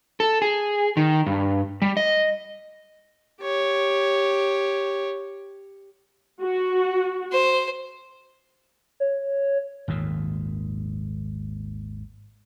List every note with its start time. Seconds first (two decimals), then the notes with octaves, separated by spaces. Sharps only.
0.20 A4
0.42 G#4
0.97 D#3
1.26 G2
1.82 G3
1.97 D#5
3.41 G4 C#5
6.41 F#4
7.32 C5
9.00 C#5
9.88 G#1 D#2 A#2